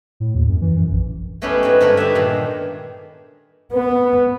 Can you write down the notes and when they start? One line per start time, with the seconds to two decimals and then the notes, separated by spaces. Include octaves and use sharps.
0.20 A2
0.35 D#2
0.48 F#2
0.61 E3
0.76 F#2
0.92 A#1
1.42 G#3 A3 B3 C#4 E4 G4
1.63 G#2 F#3 B3
1.81 G2 D3 A3 A#4 C#5 B5
1.97 D#4 G4 E5
2.15 G2 A#2 D#3 G#3
3.73 B3 B4